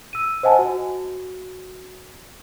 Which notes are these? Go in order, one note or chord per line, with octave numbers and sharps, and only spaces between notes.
E6 D#7
C5 D#5 F#5 G#5 A5
F#4